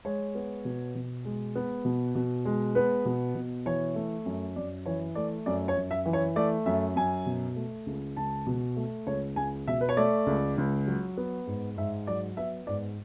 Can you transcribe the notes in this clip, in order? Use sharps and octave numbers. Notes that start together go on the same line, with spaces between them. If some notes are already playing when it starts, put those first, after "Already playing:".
G#3 C#5
B3
B2
B2
G#3
B3
B2
B2
G#3
B3 B4
B2
B2
E3 C#5
A3
F#2
F#2 D5
E3 C#5
A3 D5
F#2 D5
C#5
F#2
E5
E3
C#5
A3 D5
F#2 E5
F#2 G#5
B2
A3
C#2
C#2 A5
B2
A3
C#2 C#5
C#2 G#5
B2 E5
B4
C#5
A3 D5
C#2
C#2
F#3
B3
G#2
G#2 E5
F#3 D5
B3 E5
G#2 D5